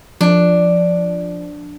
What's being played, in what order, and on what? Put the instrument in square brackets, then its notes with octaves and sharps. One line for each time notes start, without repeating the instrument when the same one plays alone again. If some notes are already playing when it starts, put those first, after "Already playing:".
[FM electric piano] F3 [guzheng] D4